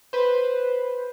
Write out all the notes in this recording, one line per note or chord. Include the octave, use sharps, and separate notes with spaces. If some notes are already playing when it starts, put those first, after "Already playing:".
B4 C5